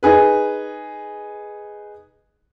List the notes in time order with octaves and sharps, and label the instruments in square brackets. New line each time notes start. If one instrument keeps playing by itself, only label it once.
[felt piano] D#4 G#4 B4